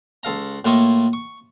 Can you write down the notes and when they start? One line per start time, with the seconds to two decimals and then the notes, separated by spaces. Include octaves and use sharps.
0.23 C#2 A4 F5 A#5
0.65 A2 A#3 E4 F4 D#5 C#6
1.13 C#6